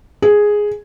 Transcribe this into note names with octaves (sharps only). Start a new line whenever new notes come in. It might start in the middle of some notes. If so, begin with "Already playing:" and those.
G#4